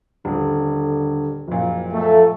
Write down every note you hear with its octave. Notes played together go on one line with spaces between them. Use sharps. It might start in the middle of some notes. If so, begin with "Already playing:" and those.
D#1 D3
F#1 A#2 F3
A3